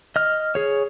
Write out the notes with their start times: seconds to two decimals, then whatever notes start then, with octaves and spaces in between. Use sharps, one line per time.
0.16 D#5 F6
0.55 G#4 C#5